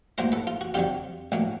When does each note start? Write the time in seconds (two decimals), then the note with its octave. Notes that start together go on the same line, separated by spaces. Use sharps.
0.18 A2 F#3 A#3 A#4 C5
0.32 A4 B4
0.47 F4
0.61 F#4
0.74 F2 D3 F#3 F4 G4
1.32 A#1 A2 F#3 A#3